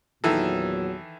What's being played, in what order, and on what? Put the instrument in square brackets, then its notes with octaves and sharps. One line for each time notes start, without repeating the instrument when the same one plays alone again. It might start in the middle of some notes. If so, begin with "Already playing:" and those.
[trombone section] E2 A#2 F#3 [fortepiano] D#3 E3 A4